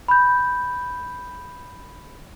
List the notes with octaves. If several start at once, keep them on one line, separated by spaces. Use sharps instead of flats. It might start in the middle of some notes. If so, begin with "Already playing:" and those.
B5 G6